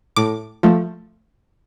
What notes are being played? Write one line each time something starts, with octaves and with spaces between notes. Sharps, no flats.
A2 D6
F3 A3